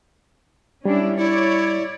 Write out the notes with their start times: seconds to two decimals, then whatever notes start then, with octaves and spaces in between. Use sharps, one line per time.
0.85 G3 C#4 D4 E4
1.17 E4 C#5 D5